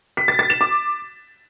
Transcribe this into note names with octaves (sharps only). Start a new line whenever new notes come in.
B6
A6
A6
E7
D6